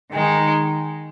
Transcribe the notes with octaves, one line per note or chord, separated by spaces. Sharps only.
D#3 G#3 D#4